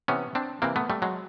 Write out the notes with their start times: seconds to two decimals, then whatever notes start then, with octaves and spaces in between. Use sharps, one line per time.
0.08 C3 E3 B3 C#4
0.35 C4 D4
0.62 C3 E3 A#3 C4
0.76 A3 B3
0.90 G3 A3
1.02 F#3 G#3